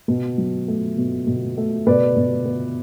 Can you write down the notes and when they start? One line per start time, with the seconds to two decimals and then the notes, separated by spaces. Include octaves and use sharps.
0.08 B2
0.38 F#3
0.68 A3
0.97 B2
1.27 B2
1.57 A3
1.87 B2 B4 D5
2.16 B2
2.45 B3